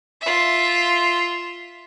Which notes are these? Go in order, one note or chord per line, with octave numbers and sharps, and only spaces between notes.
F4 E5